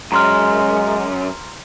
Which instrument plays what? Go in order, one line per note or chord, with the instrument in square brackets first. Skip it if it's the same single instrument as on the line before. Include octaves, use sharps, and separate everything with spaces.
[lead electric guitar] F#2 [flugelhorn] G#3 [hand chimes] A#5 C6 F6